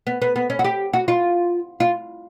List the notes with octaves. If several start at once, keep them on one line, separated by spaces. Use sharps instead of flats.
B3
B3
B3
C#4
F#4
G4
F#4
F4
F4